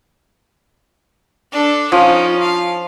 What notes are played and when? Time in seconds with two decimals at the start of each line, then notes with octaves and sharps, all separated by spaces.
1.52 D4 A4
1.92 F3 C#4 D#4
2.40 F5